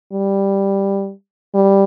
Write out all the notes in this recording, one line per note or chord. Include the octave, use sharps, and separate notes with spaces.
G3
G3